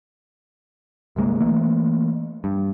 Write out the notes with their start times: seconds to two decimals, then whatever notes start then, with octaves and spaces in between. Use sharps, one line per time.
1.16 G1 C2 G#3 A#3
1.40 E3 A3 A#3
2.44 G2